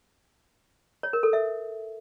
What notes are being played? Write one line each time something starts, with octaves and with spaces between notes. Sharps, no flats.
C#5
A#4
A4
E5